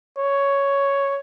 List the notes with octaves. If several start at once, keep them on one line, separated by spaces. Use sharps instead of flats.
C#5